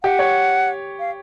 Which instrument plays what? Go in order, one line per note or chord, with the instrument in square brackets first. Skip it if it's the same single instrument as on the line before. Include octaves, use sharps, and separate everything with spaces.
[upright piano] G4 [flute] F#5
[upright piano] C#5
[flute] F5